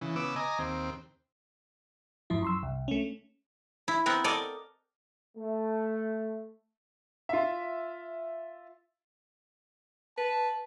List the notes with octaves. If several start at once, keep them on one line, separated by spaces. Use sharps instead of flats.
C#3 E3
C#3 B3 D6 E6
D#5 G#5 A#5 D6
D#2 C4
F2 G#2 F3 E4
F#2 C6 E6
C2
A3 C#4
E4
B3 C4 A#4 F#5
A4 A#4 D5 D#5
A3
F4 E5
B4 A5